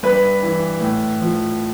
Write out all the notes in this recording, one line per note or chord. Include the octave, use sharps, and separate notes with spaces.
G2 B4
E3
A2
F3